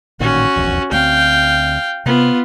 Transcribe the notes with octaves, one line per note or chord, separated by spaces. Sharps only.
A1 A#2 D#3 C#4 F#4
D#1 A#1 E2
D2 G#3 C4 F5 G5
C3 B3 F4